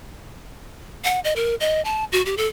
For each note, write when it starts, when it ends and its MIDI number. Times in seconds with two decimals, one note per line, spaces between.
1.04 1.20 78
1.24 1.34 75
1.36 1.55 70
1.60 1.81 75
1.85 2.05 81
2.12 2.24 66
2.26 2.37 67
2.37 2.47 69